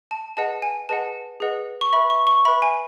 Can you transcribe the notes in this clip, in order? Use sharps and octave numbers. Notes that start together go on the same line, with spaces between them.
A5
G#4 B4 D#5 F#5 A5
G#5
G#4 B4 D#5 F#5 A5
G#4 B4 D#5 F#5
C#6
B4 E5 B5
C#6
C#6
B4 E5 B5
G#5